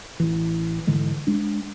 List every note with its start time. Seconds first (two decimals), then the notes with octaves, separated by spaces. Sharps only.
0.20 A1 E3
0.87 G#2 D3 E3 G#3
1.27 G#3 D4